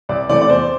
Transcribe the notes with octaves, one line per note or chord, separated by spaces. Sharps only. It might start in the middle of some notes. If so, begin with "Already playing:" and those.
C2 D5
C3 E3 A3 D5
D5
E2 C5